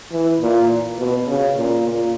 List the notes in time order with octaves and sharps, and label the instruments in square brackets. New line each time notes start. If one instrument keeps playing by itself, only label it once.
[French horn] E3
A#2
B2
C#3
A#2
A#2